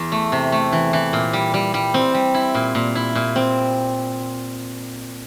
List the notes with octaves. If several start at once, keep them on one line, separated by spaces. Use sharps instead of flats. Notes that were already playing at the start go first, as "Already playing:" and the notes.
Already playing: E2
A3
C3
A3
E3
E3
A#2
G3
G3
G3
C4
G3
E4
A#2
A#2
E4
A#2
C4